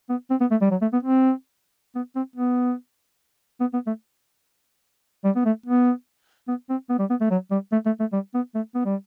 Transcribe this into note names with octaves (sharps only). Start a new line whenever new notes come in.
B3
C4
B3
A3
G3
F#3
A3
B3
C4
B3
C4
B3
B3
B3
A3
G3
B3
A3
B3
B3
C4
B3
G3
B3
A3
F#3
G3
A3
A3
A3
G3
B3
A3
B3
G3